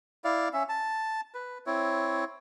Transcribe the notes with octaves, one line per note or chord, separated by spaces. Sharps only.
E4 D5 F5
C#4 E5
A5
B4
C4 E4 C#5